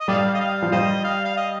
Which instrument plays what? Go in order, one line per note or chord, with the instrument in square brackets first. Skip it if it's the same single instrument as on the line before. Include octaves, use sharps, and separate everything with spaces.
[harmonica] D#5
[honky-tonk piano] G3 [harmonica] A4 D5 F5
[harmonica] D#5
F5
[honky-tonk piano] F3
[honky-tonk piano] G3 [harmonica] C5 D#5
[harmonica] F5
F5
D#5